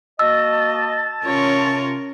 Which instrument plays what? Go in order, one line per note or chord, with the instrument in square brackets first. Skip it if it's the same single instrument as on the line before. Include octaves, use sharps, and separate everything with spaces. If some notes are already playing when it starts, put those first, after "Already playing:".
[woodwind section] A#3 F#4 D#5 [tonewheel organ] A5 [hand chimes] E6
[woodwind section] C3 F4 [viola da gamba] C#4 A#4 C#5